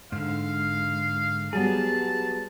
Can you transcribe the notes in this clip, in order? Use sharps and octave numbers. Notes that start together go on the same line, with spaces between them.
G#2 D3 F5
F#3 G3 B3 G#4 A5